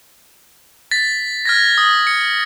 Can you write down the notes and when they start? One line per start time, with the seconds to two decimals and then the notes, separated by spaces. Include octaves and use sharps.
0.91 A6 B6
1.45 F6 G#6 A#6
1.78 D#6
2.07 C#7